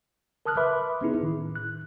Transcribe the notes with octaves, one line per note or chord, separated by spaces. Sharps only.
A#4 A5 D#6 F6 F#6
B4 E5 B5 C6 D6
B3 C#4 D#4 E4 G#4
A2 D#3
F#6